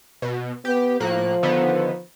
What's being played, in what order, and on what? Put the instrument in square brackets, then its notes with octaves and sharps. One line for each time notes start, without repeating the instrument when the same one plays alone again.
[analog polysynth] B2
[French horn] B3 [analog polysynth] G4
[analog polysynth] A2 A#3 F#6 [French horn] F3
[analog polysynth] D3 D#3 B3